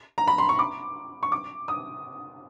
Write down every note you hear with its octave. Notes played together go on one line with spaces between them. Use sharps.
A#5
B5
C6
C#6
D6
C#6
D6
D#6